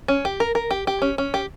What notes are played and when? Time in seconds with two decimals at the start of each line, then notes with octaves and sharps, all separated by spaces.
0.08 C#4
0.25 G4
0.40 A#4
0.55 A#4
0.71 G4
0.87 G4
1.02 C#4
1.18 C#4
1.34 G4